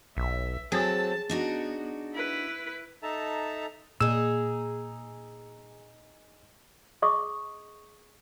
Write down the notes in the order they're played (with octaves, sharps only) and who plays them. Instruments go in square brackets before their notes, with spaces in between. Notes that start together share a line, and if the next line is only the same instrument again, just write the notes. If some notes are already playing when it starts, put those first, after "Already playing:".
[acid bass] B1 [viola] E5
[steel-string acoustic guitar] F#3 C4 A4 [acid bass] G#4 [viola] A5
[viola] B3 [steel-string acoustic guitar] D4 D#4 F#4
[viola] E4 B4
[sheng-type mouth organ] D#4 A4 E5 A5 A#5
[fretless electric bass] A#2 [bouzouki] D#4 G#4 [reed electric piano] E6
[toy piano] G#4 D#5 C#6 D#6